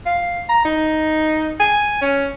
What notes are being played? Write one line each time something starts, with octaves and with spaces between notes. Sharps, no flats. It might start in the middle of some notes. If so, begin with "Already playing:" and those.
F5
A#5
D#4
G#5
C#4